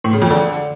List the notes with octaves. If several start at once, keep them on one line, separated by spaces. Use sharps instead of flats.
A2
C#3
F2
D3